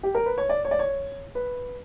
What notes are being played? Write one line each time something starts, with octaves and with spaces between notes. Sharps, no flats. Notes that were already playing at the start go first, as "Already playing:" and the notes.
G4
A#4
B4
C#5
D5
C#5
D5
C#5
B4